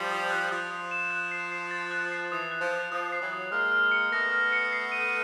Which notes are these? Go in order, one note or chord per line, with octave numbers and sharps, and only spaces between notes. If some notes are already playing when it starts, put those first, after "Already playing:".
Already playing: F3 G3
D#6
F#6
F3 D#6
D#6
E7
F#6
C7
C7
A6
F#6
C7
E3 D#6
F#6
F3
D#6
F3 D#6
C7
E3 F#3
D#6
G#3 A#3 F6
F6
C#7
A3 B3 A#6
F6
C#7
C7
D#7